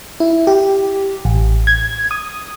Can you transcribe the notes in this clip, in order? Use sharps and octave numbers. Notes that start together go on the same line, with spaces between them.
E4
G4
A1
G#6
D#6